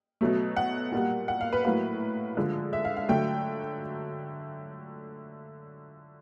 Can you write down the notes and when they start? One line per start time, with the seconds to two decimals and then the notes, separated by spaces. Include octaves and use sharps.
0.21 B2 F#3 A3
0.56 F#5
0.92 A#2 G3 A#3
1.28 F#5
1.41 F5
1.53 B4
1.65 A2 F#3 A#3 B4
2.37 D3 F3 G#3
2.73 E5
2.85 F5
2.97 F5
3.09 D3 F#3 A3 G5